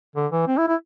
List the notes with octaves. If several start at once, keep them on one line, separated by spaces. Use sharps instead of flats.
D3
E3
C4
E4
E4